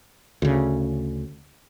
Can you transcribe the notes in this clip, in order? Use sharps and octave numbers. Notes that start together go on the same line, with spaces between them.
D2 C#3